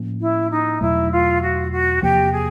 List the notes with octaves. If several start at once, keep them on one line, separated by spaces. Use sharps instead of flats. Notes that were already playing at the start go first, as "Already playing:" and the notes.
Already playing: A2 F3 A#3 C#4
E4
D#4
E2 B2 F#3 A3 E4
F4
F#4
F#4
E2 C3 F3 A#3 G4
G#4